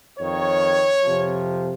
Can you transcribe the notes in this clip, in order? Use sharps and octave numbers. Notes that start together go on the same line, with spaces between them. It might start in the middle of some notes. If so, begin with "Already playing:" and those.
F2 D#3 C#5
F2 C3 F3